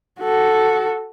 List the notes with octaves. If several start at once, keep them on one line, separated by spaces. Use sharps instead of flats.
F#4 A4